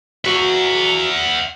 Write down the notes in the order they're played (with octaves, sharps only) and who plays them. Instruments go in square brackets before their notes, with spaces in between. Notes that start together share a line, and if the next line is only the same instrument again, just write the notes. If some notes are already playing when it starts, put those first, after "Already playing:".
[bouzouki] A#3 F#4 [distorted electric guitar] E5 F#5